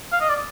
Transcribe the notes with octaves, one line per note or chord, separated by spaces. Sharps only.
F5
D#5
D5